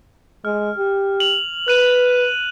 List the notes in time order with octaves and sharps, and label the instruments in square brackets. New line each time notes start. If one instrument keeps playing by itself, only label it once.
[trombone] G#3 [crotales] F6
[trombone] G4
[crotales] F7 F#7
[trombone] B4 [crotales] F#6 D#7